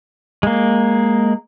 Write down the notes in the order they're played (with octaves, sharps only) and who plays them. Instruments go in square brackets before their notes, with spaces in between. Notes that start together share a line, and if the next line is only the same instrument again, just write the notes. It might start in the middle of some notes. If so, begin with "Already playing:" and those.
[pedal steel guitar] G#3 A#3